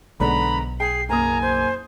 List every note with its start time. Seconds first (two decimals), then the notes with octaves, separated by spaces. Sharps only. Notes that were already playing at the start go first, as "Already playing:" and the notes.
0.20 B1 G#2 D3 B3 A#5 B5
0.80 G#4 G5 C7
1.09 F#1 A#3 G#5 A#5 D#6
1.42 C5